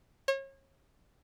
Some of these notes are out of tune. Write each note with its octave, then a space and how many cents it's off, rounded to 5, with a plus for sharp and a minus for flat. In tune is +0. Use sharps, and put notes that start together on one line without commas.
C#5 -35